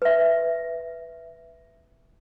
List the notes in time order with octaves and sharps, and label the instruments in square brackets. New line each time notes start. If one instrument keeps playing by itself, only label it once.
[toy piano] B4 E5